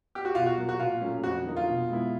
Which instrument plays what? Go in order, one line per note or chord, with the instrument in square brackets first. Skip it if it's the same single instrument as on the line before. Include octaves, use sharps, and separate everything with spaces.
[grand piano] G4
F#4
[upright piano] B2 [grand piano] F4
[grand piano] F#4
[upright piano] F#3 A#3
[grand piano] F#4
[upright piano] A#2 [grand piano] F4
[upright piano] F#3 A3 C#4
[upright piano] F2 [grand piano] F#4
[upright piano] D3 F#3 A#3 D#4
[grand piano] F4
[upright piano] B2
G#3 B3 E4